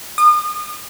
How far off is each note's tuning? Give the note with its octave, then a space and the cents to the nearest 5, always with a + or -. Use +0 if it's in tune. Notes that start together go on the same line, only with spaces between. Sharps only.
D#6 -40